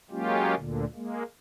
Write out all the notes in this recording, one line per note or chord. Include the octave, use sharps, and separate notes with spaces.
F#3 G#3 A#3 C#4 F4 G4
D2 A#2 D3
G#3 A#3